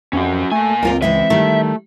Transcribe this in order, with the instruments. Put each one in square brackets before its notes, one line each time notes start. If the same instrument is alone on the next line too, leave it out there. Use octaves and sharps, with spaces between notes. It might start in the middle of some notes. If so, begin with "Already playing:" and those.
[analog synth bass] F2 [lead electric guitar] C#4 F#4
[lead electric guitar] A#2 G#5 [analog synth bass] A3
[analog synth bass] C#2 [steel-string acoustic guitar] C4 F4 A#4
[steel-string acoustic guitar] E3 G#3 C4 [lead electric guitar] E5
[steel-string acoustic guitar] D#3 G3 [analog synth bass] A3